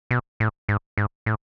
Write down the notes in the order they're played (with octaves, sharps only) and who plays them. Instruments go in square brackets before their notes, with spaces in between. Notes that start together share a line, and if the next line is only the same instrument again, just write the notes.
[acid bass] B2
A2
G#2
G#2
A2